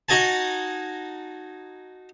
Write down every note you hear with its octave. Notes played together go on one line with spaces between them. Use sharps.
D#4 F#4 D#5 G#5 A5